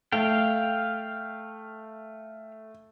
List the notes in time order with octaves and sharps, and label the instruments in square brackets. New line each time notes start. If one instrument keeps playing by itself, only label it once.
[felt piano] A3 [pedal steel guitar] F5 G5